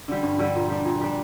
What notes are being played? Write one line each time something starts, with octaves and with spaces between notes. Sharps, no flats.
D3 G3
G2
D3 G3
A#2
G3 D4
A#2
G3 D4